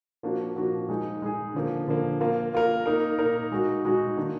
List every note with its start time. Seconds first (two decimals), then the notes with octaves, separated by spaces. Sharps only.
0.23 F3 A#3 D4 F#4
0.56 F3 A#3 D4 F#4
0.89 G#3 D#4 G#4
1.22 G#3 D#4 G#4
1.54 D3 F3 A#3
1.87 D3 F3 A#3
2.20 A#3 F4 A#4
2.53 A#3 F4 A#4
2.86 A#3 D#4 A#4
3.18 A#3 D#4 A#4
3.52 G#3 D#4 F#4
3.85 G#3 D#4 F#4
4.17 D#3 A#3 D4